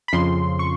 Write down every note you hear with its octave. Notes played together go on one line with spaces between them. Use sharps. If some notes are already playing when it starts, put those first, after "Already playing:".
B5
F2 C#3 F3 C6
C#6